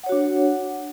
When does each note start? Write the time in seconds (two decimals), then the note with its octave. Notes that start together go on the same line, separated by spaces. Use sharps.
0.04 F#5
0.06 C#5
0.09 F#4
0.12 D4